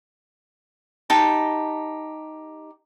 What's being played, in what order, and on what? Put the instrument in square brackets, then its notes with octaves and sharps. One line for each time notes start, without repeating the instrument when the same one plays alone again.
[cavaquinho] D#4 G4 A5